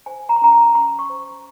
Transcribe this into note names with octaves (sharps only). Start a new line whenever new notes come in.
C5 G#5
A#5
C6
C#4 A#5
A#5
C#4 C6
C#6
C5